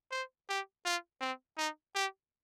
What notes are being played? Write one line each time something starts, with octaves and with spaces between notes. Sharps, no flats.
C5
G4
F4
C4
D#4
G4